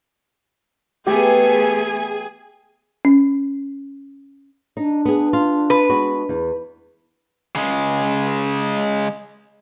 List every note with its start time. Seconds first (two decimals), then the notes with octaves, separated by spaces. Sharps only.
1.07 E3 A3 B3 G4 G#4 G#5
3.05 C#4
4.77 D4 D#4
5.05 B3 G#4
5.33 F4
5.70 B4
5.90 G#3 B3 F#4
6.29 E2
7.55 C#3 G#3